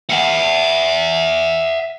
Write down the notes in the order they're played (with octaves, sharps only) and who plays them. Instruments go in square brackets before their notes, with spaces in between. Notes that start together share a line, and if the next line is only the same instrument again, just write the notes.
[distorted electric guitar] E5 F#5